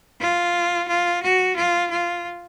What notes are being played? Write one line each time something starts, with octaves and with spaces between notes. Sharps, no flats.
F4
F4
F#4
F4
F4